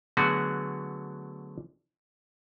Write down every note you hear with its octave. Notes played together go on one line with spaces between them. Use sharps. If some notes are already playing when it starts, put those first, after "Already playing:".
D3 F#3 A3 B3 F#4 G#4